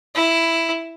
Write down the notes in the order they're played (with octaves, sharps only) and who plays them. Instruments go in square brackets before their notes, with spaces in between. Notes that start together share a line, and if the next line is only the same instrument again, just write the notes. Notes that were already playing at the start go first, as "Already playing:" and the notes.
[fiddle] E4